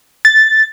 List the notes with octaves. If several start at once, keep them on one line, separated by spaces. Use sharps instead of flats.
A6